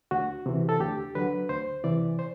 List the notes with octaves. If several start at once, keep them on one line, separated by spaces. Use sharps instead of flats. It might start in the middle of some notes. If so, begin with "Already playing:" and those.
D2 F#4
C3 E3
A4
D2 G4
D3 F#3 B4
D2 C5
C3 E3 D5
C5